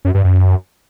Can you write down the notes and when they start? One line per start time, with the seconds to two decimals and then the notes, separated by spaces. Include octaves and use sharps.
0.05 F#2
0.15 G2
0.24 F#2